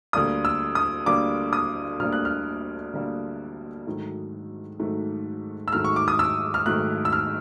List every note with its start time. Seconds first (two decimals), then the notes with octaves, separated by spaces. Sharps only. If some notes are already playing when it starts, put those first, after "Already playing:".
0.13 D2 D3 G3 A#3 D#6
0.45 E6
0.75 D#6
1.06 D2 D3 G3 A#3 D6
1.53 D#6
1.99 D2 D3 G3 A#3 F6
2.13 F#6
2.25 F6
2.93 D2 D3 G3 A#3
3.86 G#2 D#3 F#3 A3
4.79 G#2 D#3 F#3 A3
5.68 E6
5.72 G#2 D#3 F#3 A3 F6
5.84 C#6
5.96 D6
6.08 D#6
6.19 E6
6.54 F6
6.66 G#2 D#3 F#3 A3 F#6
7.05 E6
7.13 F6